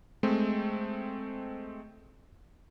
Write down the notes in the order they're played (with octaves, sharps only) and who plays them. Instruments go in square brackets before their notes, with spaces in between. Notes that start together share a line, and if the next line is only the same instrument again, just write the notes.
[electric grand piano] G#3 A3 C4